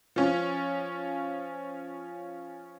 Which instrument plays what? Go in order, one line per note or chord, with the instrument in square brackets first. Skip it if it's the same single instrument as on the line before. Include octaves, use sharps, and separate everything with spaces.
[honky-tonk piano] F3 C#4